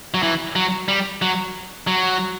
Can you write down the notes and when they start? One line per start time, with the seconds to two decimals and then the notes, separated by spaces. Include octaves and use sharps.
0.14 F#3
0.23 E3
0.56 F#3
0.88 G3
1.22 F#3
1.87 F#3